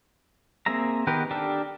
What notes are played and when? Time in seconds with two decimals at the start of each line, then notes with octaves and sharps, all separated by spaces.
0.66 A#3 C4 G#4 E5 A#5
1.07 D#3 B3 G4 A#4 B4
1.31 D4 G4 A4 A#4